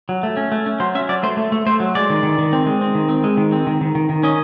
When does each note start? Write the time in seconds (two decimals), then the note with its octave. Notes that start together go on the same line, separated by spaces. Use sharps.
0.09 F#3
0.23 A3
0.37 C#4
0.52 A3
0.66 C#4
0.80 F#3 C5
0.95 C#4 E5
1.09 F#3 D5
1.23 A3 C5
1.37 A3
1.52 A3
1.66 A3 C5
1.80 F#3
1.95 G#3 D5
2.10 D#3
2.23 D#3
2.38 D#3
2.53 C4
2.66 G#3
2.81 C4
2.95 D#3
3.09 C4
3.24 G#3
3.37 D#3
3.52 C4
3.67 D#3
3.81 D#3
3.95 D#3
4.09 D#3
4.23 C#4 D#5